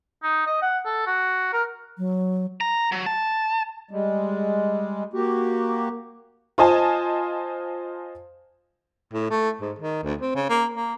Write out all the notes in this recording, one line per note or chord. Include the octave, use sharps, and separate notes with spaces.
D#4
D#5
F#5
A4
F#4
A#4
F#3
A#5
F#3
A5
G3 G#3
A#3 F#4 G4
F4 C5 D#5 G#5 A5
A2
A3
G#2
D#3
D2
C4
C#3
A#3
A#3